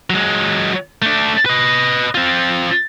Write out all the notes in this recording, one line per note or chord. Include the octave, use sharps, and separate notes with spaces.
F#3 G#3
A3 D4
B4 D#5
C4 F4